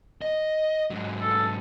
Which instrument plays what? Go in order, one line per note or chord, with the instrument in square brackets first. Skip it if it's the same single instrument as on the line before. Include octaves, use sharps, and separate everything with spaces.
[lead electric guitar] D#5
G#2 F#3
[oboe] A4